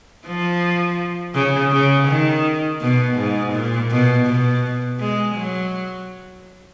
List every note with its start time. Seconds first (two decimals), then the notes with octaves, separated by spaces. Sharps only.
0.26 F3
1.34 C#3
1.72 C#3
2.08 D#3
2.81 B2
3.17 G#2
3.53 A#2
3.90 B2
4.26 B2
4.99 G#3
5.35 F#3